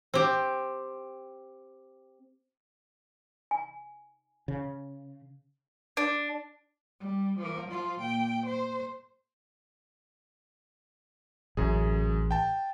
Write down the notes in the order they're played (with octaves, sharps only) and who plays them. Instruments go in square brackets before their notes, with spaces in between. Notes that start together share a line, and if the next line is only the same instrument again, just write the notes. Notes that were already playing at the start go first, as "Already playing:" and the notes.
[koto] C4 G4
[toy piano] G#5
[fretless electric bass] C#3
[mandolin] D4
[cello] G3
F3 A#4
F3 F4
A#2 G5
C5
[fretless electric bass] A1 [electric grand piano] F#2 G#4
[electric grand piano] G5 A5